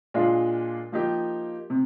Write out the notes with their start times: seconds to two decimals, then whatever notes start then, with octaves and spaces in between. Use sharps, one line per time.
0.14 A#2 G#3 D4 F4
0.92 F3 A#3 D#4 G4
1.70 C3